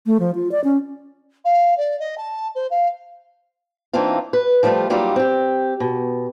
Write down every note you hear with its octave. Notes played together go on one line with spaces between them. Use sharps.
A3
F3
F4
D5
C#4
F5
D5
D#5
A5
C5
F5
E3 A#3 C4 D4 D#4 F4
B4
F3 G3 A3 B3 F4
F#3 G3 A#3 D#4 F4 D5
C4 G4
B2